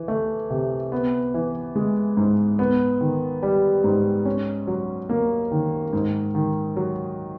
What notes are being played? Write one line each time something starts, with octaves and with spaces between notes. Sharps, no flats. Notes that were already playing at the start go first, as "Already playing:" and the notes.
Already playing: E3
A3
C3
B3
E3
G#3
G#2
B3
D#3
G3
G#2
C#4
F#3
A#3
D#3
G#2
D#3
F#3